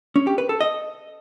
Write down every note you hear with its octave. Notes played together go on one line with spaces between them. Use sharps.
C#4
G4
B4
A4
D#5